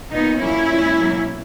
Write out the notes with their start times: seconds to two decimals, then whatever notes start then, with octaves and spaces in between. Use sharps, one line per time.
0.12 A#2 A#3 B3 D#4
0.41 A#2 F#3 A#3 C#4 E4
0.70 A#2 G#3
0.98 B2 F#3 A#3